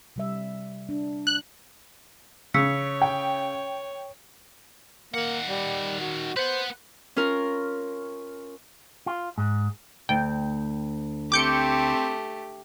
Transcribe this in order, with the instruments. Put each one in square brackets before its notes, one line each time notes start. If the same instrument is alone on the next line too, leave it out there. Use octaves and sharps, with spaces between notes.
[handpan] C3 G3 E5
D4
[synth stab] F#6
[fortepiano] C#3 [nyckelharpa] C#5 [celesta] E6 B6 C#7
[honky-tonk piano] G5
[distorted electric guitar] D#3 F#5 [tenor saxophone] A#3
[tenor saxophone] G3
F#4
[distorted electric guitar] B4 F#5 [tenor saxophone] C5
[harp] C#4 F4 A#4
[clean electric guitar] F4
G#2
[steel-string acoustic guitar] D2 [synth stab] G5
[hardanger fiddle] A3 G4 [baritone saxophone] C4 [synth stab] D6 G6 C#7